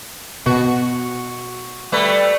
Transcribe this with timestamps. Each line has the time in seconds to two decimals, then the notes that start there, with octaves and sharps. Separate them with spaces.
0.46 B2 F#4
1.92 G3 A3 B4